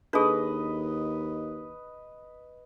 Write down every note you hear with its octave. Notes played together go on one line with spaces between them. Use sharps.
D#2 D4 G#4 A4 B4 D#5